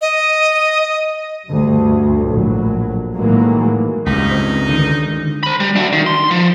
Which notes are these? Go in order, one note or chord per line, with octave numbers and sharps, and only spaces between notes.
D#5
D2 G2
A#1 A2 F#3
A2 D#3 E3 F#3 G#3 A#3
C#2 G2 D#4 B6
C4
D3 D#3
C5 B5
G3
D4 F#4
D#3
C6
F3